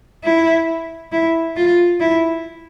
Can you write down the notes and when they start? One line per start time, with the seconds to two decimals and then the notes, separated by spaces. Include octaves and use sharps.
0.24 E4
1.12 E4
1.56 F4
2.00 E4